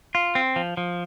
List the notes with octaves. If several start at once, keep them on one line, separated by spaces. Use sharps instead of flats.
F4
C4
F3
F3